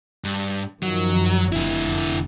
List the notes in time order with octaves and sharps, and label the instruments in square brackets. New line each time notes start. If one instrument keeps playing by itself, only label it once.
[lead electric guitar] G2
[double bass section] F#2 D#3 F3 [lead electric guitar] F#3
[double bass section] F1 [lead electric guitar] D3 E4